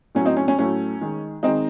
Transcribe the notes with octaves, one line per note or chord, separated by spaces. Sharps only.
A2 F#3 A3 C#4
C4 D#4
C#4
C#4
A2 F#3 A3 C#4
D#3 G#3
D#3 G#3 C4 D#4